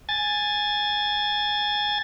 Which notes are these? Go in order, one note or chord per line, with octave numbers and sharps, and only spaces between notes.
G#5 A6